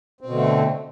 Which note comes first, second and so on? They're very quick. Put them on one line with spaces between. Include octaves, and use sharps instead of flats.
C4 B2 D3 A3